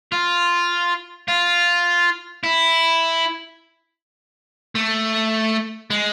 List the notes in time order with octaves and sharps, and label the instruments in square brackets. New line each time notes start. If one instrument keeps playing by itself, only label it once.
[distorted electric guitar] F4
F4
E4
A3
G#3